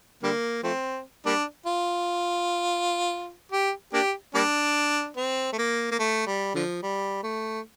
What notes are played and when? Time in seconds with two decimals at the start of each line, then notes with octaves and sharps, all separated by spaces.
0.23 D3 G3 A#3
0.63 F3 A3 C4
1.26 G3 A#3 D4
1.66 F4
3.52 G4
3.93 A#3 D4 G4
4.35 G3 A#3 D4
5.17 C4
5.53 A3
5.58 A#3
5.91 A#3
5.99 A3
6.27 G3
6.55 D3 F3
6.82 G3
7.23 A3